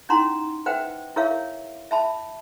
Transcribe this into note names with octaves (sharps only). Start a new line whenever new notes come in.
C#4 D#4 E4 F#5 A#5 C6
B4 C5 E5 F#5 G5
E4 G#4 A#4 C#5 E5 F5
E5 A5 B5